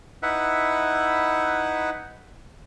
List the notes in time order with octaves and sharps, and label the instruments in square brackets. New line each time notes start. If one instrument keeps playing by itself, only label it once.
[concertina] D#4 E4 B4 E5 F#5